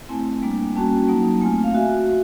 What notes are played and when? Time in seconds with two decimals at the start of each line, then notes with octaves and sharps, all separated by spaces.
0.09 A3 C4 E4 G#5
0.42 G3 A#3 D4
0.75 G3 A#3 C#4 F#4 A5
1.09 F#3 A#3 D#4
1.42 A3 C4 F4 G#5
1.53 G#5
1.64 F5
1.75 F#4 E5